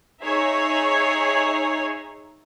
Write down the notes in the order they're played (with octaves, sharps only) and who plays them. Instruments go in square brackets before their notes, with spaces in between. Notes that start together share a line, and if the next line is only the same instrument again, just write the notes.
[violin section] D#4 G#4 C#5 E5